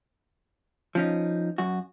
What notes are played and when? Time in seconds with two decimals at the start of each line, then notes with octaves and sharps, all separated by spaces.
0.95 F3 C#4 D#4
1.58 F#2 F#4